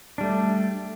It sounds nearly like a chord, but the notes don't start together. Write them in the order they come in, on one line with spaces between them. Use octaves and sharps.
D4 G3 A3